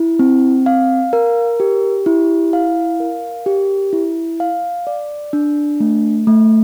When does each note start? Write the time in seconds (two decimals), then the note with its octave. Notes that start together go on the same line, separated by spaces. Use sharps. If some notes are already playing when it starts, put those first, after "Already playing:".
Already playing: E4
0.19 C4
0.66 F5
1.13 A#4
1.60 G4
2.06 E4
2.53 F5
3.00 A#4
3.46 G4
3.93 E4
4.40 F5
4.87 D5
5.33 D4
5.80 A3
6.27 A3